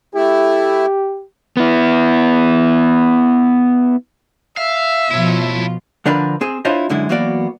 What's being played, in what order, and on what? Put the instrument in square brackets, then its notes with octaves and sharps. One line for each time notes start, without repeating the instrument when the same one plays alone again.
[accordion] A3 E4 [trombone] G4
[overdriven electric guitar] B3 E4
[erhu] E5 [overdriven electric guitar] F5
[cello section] B2 F3 F4 [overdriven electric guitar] E4 C#5
[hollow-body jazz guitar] D3 F3 D4 A#4 B4
C4 G#4
D4 E4 F4 C5 C#5 D#5
F#2 D3 G#3 E4
E3 F#3 A#3 B3 F#4 D5